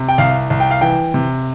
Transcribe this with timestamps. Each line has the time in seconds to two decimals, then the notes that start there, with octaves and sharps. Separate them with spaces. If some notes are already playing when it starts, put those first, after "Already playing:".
Already playing: C3
0.09 G5
0.18 C2 F5
0.50 C2
0.60 G5
0.71 F5
0.81 E3 G5
1.14 C3